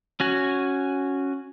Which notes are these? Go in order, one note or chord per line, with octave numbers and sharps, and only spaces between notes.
C#4 F#4 G#5